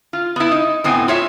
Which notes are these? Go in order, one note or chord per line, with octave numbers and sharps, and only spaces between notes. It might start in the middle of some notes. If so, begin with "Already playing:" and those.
F4
B3 E4
D#4
A2 B3 C4 G#5
F4 C#5 E5